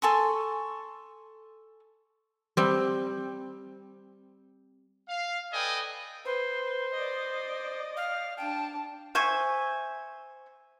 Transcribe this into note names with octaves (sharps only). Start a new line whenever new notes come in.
A4 G#5 C6 C#6
G3 C4
F5
A4 B4 D5 D#5 G5 G#5
B4 C5
D5 D#5
F5
D4 G5 A5
C5 E5 G#5 C#6